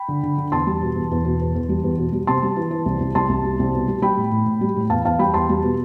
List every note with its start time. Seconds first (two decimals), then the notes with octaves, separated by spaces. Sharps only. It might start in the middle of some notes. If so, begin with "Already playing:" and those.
Already playing: G5 B5
0.08 D3
0.23 D3
0.38 D3
0.52 E2 A5 C6
0.67 G3
0.81 B2
0.95 E2
1.11 E2
1.25 B2
1.40 E2
1.55 E2
1.69 G3
1.83 E2
1.98 B2
2.12 G3
2.27 C3 A5 C6
2.42 G3
2.56 E3
2.71 E3
2.86 C2
3.00 C2
3.15 C2 A5 C6
3.29 C2
3.45 G3
3.59 C2
3.74 B2
3.88 G3
4.02 G3 G5 B5
4.17 A2
4.32 A2
4.46 A2
4.61 G3
4.76 A2
4.90 E2 F5 A5
5.05 E2 F5 A5
5.19 G3 G5 B5
5.34 E2 A5 C6
5.49 G3
5.63 B2